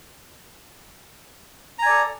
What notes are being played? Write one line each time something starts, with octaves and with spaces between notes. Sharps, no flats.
A4 D5 G#5 A#5